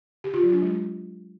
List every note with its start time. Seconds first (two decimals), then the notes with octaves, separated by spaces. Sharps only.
0.24 G4
0.34 F4
0.43 F#3
0.53 D4
0.62 G#3